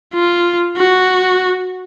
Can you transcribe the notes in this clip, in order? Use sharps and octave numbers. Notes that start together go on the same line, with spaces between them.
F4
F#4